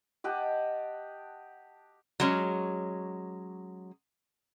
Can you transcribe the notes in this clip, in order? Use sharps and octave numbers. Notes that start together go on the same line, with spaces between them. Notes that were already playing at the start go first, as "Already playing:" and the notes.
G4 D#5 F#5 A5
F#3 G#3 C#4